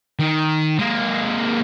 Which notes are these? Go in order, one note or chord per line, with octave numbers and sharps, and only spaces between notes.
D#3
G#3 A#3